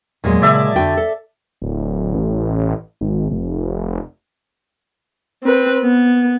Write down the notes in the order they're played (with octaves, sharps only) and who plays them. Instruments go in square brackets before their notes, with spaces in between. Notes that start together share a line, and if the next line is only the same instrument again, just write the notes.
[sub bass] E2 [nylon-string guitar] A#2 F#3 G#3
[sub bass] C#3 [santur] D5 E5 A5
[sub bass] F2 [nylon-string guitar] D3 F#4 G5
[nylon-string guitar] A4
[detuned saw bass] D1
A1
G#1
F1
[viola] C4 B4
B3